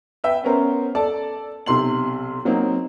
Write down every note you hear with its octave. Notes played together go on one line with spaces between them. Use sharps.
B4 E5 G5
B3 C#4 A#4 C5
A4 D5 A5
B1 C3 C6 F#7
F#3 A#3 C4 D#4